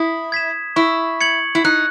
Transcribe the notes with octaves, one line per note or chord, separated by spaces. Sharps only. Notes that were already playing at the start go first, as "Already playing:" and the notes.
Already playing: E4 D#6
G#6 B6 E7
E4 C#6
G#6 C#7 F#7
E4
D#4 F#6